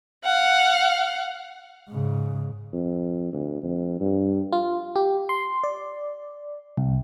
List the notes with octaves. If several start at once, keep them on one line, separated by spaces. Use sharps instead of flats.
F5 F#5
G#2 C#3
F2
D2
F2
G2
F4
G4
C6
D5
C2